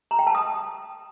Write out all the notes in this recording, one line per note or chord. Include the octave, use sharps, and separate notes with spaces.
A#5
G5
A5
D#6